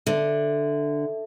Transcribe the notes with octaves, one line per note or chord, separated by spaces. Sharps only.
D3 E5